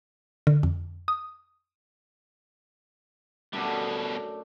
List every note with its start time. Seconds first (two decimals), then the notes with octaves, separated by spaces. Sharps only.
0.47 D3
0.63 F2
1.08 D#6
3.53 F#2 B2 G3 A3 D4